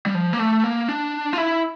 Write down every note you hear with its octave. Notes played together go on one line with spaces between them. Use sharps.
G3
F3
A#3
A3
A#3
D4
F4
E4